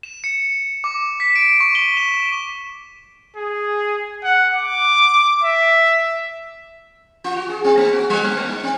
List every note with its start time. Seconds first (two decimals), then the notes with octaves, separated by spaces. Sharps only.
0.03 E7
0.24 C#7
0.84 D6
1.20 B6
1.36 D7
1.60 C#6
1.75 G7
1.97 E7
3.37 G#4
4.24 F#5
4.56 D6
5.44 E5
7.24 F4
7.36 F#4
7.49 G#4
7.64 C4
7.77 A#3
7.93 F#4
8.10 G3
8.24 A#3
8.37 G#3
8.49 D#4
8.63 C4